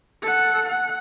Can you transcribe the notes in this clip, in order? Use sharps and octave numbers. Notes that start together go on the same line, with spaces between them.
A4 F#5
F#5